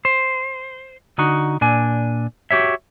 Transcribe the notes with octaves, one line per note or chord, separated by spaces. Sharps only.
C5
D3 D#4 F#4
A#2 D4 G#5
F#4 G4 C#5 E5